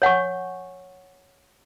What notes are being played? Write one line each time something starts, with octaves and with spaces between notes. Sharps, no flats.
C#5 F#5 G#5 C#6